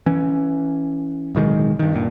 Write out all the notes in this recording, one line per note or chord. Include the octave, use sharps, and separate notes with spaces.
E3 C#4
D1 B1 D#3 G#3
G2 D#3
F#1 G2 A#2